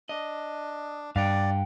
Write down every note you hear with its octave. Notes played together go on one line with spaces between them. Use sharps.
D4 D#5
G2 D5 F5 G5